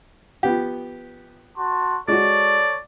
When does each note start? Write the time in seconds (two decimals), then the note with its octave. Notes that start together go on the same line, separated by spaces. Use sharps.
0.43 F3 B3 G4
1.58 F#4 A5 C6
2.08 G#3 F#4 A4 C#5 D5